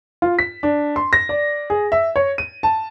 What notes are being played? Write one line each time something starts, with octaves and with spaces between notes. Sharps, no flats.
F4
B6
D4
C6
A#6
D5
G#4
E5
C#5
D#7
A5